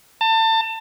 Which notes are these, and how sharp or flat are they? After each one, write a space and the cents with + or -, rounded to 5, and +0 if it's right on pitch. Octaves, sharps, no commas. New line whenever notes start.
A5 +30